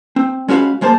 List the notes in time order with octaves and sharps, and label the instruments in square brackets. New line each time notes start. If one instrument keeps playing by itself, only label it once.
[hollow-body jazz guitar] C4
G#3 C#4 F#4 C5 F5 B5
C#2 G#3 A#3 C5 A5